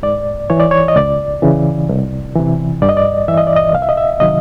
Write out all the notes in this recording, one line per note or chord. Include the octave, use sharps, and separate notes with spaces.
G#2 D5
E3 C#5
D5
C#5
D#5
C#2 D5
C#3 E3
C2
C3 E3
G2 D5
D#5
D5
E3 E5
D#5
D5
D#5
C2 F5
E5
D#5
E5
C3 D#3 F#3 D#5